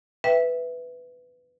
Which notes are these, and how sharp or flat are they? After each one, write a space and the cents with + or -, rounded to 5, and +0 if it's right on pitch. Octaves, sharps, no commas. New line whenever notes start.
B4 +10 E5 +0 G5 +0